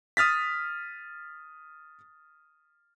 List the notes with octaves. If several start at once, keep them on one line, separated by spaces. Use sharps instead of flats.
D#6 F6 A6 B6